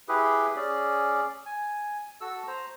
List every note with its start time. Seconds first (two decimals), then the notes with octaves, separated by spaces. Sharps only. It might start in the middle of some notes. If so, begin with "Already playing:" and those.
0.08 E4 G4 G#4 B4
0.56 C#4 G#4 D5
1.46 G#5
2.21 F#4 A4 E6
2.48 C5 A#5